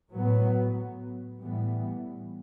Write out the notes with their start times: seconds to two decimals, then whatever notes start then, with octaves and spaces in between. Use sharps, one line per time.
0.11 A2 F#3 B3
1.39 A2 E3 G3 B3